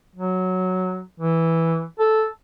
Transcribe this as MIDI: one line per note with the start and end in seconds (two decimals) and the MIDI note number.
0.15 1.03 54
1.20 1.84 52
1.99 2.27 69